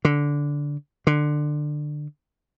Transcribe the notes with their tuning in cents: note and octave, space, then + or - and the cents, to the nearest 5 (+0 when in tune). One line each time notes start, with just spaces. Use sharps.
D3 -10
D3 +20